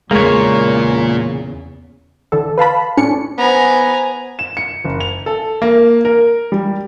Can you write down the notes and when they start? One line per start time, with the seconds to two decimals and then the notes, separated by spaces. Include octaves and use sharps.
0.11 E2 A#2 C#3 G#3 A#3 C#5
2.32 D3 E3 A4
2.58 B4 F5 A5 B5
2.97 A2 C#4 D4 C#7
3.38 B3 C5 G#5 A#5
4.39 E7
4.57 C#7
4.85 F#1
5.01 F7
5.26 A4
5.62 A#3
6.05 A#4
6.52 G3